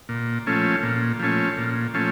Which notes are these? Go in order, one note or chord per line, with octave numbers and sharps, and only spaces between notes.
A#2
F3 A3 C#4
A#2
F3 A3 C#4
A#2
F3 A3 C#4